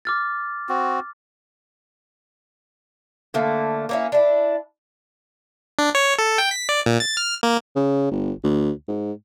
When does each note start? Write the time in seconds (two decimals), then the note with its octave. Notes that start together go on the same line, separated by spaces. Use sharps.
0.05 D6 F6 A6
0.69 C4 F#4
3.34 D3 A3 A#3
3.89 A#3 C#4 E4
4.12 D4 E4
5.79 D4
5.95 C#5
6.19 A4
6.38 G5
6.51 B6
6.69 D5
6.86 A#2
7.00 A6
7.17 F6
7.43 A#3
7.76 C#3
8.11 G1
8.44 D2
8.88 G#2